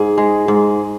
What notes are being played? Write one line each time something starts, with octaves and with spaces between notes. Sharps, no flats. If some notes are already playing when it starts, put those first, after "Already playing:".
Already playing: G#2 G#4
G#3
G#2